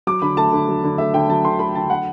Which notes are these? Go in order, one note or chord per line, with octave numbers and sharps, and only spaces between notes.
F#3 D6
D3 B5
A3 A5
D3
F#3
D3
A3 E5
D3 G5
F#3 A5
D3 C6
A3 B5
D3 A5
F#3 F#5